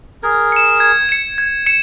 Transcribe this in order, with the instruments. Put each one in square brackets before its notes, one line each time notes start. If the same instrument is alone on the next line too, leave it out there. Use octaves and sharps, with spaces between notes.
[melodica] G#4 A#4 [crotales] G#6
[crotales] C#7 E7
G#6
C#7 E7
G#6
C#7 E7